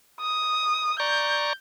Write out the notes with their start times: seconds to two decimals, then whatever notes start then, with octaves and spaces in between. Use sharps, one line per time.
0.21 D#6
1.00 D5 A#5 C#6 G6